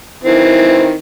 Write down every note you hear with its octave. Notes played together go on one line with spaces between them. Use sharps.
D#3 E3 C4